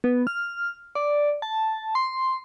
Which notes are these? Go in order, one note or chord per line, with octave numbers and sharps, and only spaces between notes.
B3
F6
D5
A5
C6